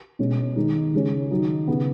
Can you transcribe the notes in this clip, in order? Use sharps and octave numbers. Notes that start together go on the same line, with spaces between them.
B2 G#3 C#4
D#3 G#3 D#4
C#3 G#3 C#4
D#3 F#3 D#4
C#3 B3